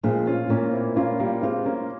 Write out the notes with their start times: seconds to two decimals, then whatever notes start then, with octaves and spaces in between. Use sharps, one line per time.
0.03 A#2 F3 G#3
0.27 C#4 F4
0.50 A#2 A#3 C#4
0.73 C4 E4
0.96 A#3 C#4 F4
1.20 G3 A#3
1.42 G#3 C4 F4
1.66 A#3 C#4